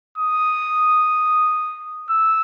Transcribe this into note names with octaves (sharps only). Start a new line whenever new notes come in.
D#6
E6